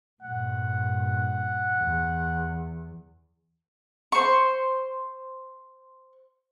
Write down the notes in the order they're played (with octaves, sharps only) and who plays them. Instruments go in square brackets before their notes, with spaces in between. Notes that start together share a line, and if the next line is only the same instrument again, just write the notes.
[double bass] G2 A#2 [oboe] F#5
[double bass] E2
[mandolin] C5 C#6